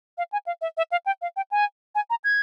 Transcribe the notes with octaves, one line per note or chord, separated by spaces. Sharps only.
F5
G#5
F5
E5
E5
F5
G5
F5
G5
G#5
G#5
A#5
G#6